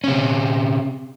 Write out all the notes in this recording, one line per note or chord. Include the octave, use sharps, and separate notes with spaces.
C3 C#4